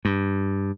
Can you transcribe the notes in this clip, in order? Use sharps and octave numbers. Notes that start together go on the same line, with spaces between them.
G2